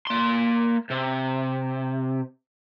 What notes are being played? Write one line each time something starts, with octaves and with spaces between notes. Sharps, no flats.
A#3 C6
C3